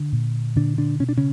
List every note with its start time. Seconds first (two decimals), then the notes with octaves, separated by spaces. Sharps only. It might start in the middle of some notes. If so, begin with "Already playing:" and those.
Already playing: D3 D4
0.12 A#2
0.56 A#2 D3 D4
0.78 D3 D4
1.00 B2 C#4
1.09 D4
1.17 C#3 C#4